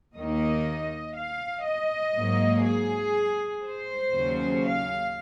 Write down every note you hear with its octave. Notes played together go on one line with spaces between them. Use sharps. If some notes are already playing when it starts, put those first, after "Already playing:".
D#2 D#3 A#3 D#4 D#5
F5
D#5
G#2 F#3 A#3
G#4
C5
D#2 C#3 F#3 C#4
F5